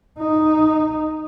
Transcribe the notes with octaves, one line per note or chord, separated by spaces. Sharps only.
D#4